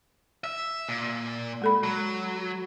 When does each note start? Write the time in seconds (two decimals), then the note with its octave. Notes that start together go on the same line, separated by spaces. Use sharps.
0.44 E5
0.89 A#2
1.62 G#3 A4 B5
1.83 F#3